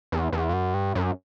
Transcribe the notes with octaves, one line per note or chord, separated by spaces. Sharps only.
E2
E2
F2
F#2
G2
F#2